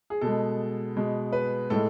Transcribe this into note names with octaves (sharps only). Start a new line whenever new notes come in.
G#4
B2 A4
G#3
B2 G#3
B4
A2 G#3 A4